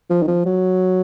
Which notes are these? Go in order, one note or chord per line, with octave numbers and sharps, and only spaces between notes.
F3
D#3
F3
F#3